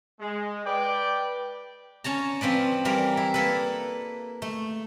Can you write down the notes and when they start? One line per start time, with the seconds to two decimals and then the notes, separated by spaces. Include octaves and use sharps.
0.20 G#3
0.65 B4 D5 G5
2.04 C#4 C#5 A5 A#5
2.41 F3 C4 B4 D5
2.85 E3 G3 A#4 A#5
3.17 E4
3.34 A#3 A4 B4
4.42 A3